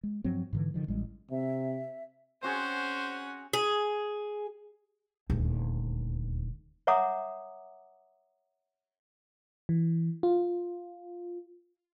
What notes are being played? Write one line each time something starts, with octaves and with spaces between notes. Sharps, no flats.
G#3
G2 F3 F#3 C4
G#2 D3 E3
D3 D#3 F3
A1 G3 G#3
C3 E5
C4 C#4 F#4 G#4 C5 F#5
G#4
D#1 D2
C#5 E5 F#5 A#5 D6 D#6
E3
F4